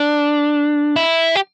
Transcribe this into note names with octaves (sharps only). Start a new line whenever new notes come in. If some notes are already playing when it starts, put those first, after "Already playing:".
Already playing: D4
E4
G4